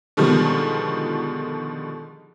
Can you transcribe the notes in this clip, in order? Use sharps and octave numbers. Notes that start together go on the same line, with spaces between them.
B2 D3 D#3 F3 G3 G#3